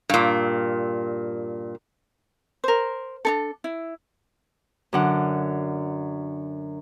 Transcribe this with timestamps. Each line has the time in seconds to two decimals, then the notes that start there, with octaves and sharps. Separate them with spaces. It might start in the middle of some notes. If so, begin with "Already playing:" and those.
0.10 G2 A#2
2.64 A#4 C5
3.25 D4 D#4 A4
3.64 E4
4.93 F#2 D3 F#5